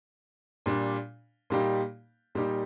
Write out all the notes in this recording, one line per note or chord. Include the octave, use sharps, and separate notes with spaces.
A#2 G3 D4
A#2 G3 A#3 D#4 G4
A#2 G3 A#3 D#4 G4